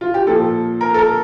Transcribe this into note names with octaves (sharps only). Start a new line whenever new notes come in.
F4
G4
A#2 F3 A4
A#4
A4
A#4